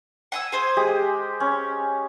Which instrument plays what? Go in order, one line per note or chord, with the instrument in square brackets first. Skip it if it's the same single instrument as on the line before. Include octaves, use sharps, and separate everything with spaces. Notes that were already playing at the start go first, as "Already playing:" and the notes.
[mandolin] F#5 G#5 E6
G#4 C5 G#5
[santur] G#3 G4
C#4